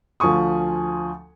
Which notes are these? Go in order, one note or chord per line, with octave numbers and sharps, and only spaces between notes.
D2 F3 F4 G#5 C#6 D#6